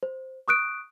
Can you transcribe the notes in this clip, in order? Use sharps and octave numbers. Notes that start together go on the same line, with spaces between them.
C5
C#6 D#6 F#6 D7